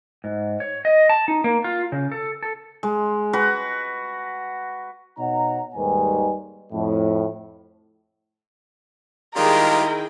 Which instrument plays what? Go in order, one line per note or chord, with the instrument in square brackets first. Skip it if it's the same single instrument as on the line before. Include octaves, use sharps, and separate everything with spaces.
[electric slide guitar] G#2
C#5
D#5
A5
D#4
A#3
F4
C#3
A4
A4
[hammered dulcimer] G#3
F#4 B4
[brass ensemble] B2 D#4 C#5 F#5 A#5
D#2 G#2 D#3 G3 B4 G#5
F2 A2
[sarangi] D#3 [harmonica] G3 G#3 F4 [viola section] E4 G#4 G5 [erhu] A#4